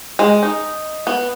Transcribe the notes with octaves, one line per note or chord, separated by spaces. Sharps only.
G#3
D#4
B3